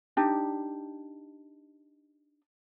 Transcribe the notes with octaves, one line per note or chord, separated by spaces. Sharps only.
D4 D#4 G4